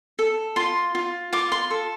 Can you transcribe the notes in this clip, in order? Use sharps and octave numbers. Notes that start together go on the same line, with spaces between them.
A4
F4 C6
F4
F4 D6
C6
A4